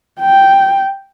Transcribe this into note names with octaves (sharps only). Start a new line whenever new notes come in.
G5